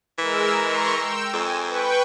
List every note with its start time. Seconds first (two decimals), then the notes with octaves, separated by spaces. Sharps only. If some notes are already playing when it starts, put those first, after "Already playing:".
0.18 E3 G#3 A#4 E6
0.58 A#5 C6 C#6
0.96 G5 E6
1.33 F2 G#5
1.65 B4 G5 C#6